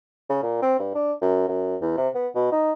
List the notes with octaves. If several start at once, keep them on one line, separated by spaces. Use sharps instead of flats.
C#3
A#2
C4
G2
D4
F#2
F#2
E2
C3
B3
B2
D#4